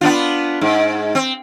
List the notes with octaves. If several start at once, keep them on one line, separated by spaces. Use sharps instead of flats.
B3 D4 F4
G#2
C4